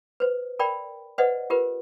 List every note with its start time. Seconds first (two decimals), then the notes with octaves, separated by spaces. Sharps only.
0.20 B4 C5
0.59 A#4 D5 G5 B5
1.18 B4 C5 D5 D#5 F#5
1.50 F4 G4 A#4 B4